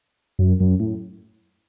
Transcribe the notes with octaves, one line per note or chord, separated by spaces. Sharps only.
F#2
F#2
A2